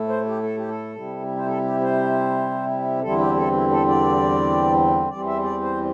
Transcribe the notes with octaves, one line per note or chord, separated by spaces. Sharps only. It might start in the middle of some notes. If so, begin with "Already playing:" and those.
Already playing: A2 A3 E4
C5
G4
A4
G4
A4
C3 G3 E4
C5
A4
G4
C5
E2 D3 G3 C4 E4 A4
G4
A4
E4
A4
D5
E2 E3 G3 C4 D5
E5
D5
C5